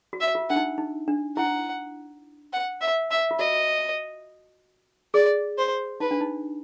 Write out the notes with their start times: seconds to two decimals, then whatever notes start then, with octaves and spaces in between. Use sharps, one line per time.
0.13 F#4
0.20 E5
0.35 F4
0.50 D4 F#5
0.56 D#4
0.78 D#4
1.08 D4
1.36 E4 F#5
2.53 F#5
2.82 E5
3.11 E5
3.31 F4
3.39 F#4 D#5
5.14 G#4 D5
5.58 C5
6.00 D#4 B4
6.11 D4
6.21 D#4